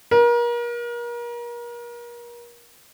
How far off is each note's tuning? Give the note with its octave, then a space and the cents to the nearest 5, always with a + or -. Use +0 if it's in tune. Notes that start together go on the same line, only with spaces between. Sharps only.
A#4 +35